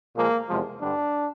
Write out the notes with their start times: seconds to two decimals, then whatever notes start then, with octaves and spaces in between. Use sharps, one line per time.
0.15 A#2 F3 G#3 A#3
0.48 E2 C3 F3 G#3
0.80 G2 D3 G3 D4